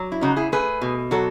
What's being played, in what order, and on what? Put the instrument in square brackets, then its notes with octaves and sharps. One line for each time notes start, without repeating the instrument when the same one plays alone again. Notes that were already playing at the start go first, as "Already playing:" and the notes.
Already playing: [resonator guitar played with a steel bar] F#3
E4
C#3 D#4 F#4
E4 G#4
A3 G#4 B4
B2
F#3 F#4 A4